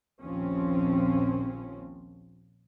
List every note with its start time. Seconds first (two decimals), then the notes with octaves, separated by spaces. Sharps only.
0.21 A#1 D#2 F3 C4 C#4